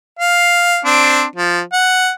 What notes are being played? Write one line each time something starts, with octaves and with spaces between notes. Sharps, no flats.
F5
C4 D4
F3
F#5